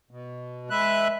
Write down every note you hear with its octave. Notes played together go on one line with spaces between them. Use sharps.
B2
G#3 B4 E5 F#6